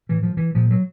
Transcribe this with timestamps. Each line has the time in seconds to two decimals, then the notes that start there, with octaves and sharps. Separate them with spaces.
0.09 A2 E3
0.23 F3
0.37 E3
0.55 A#2 F3
0.71 F#3